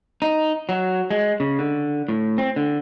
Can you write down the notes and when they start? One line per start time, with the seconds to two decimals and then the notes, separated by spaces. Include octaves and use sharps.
0.22 D#4
0.69 F#3
1.11 G#3
1.40 C#3
1.59 D3
2.08 A2
2.38 C4
2.56 D3